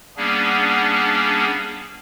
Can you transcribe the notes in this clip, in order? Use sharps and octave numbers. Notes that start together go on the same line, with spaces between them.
G3 A#3 B3 C#4 D4 G#4